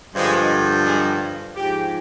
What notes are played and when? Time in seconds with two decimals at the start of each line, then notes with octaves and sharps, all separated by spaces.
0.14 G2 D3 F3 G#3
0.85 G#3
1.56 G#2 F3 G4